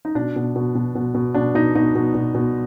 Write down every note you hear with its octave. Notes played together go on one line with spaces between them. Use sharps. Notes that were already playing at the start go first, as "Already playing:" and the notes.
D#4
B2 D4
B2
B2
B2
B2
B2
B2 D4
B2 D#4
B2 D#4
B2
B2
B2